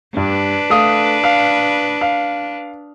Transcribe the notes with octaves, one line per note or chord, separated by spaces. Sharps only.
G2 D4 B4
A3 F5 D#6
F5
F5